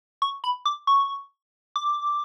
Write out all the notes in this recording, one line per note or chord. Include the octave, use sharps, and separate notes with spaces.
C#6
B5
D6
C#6
D6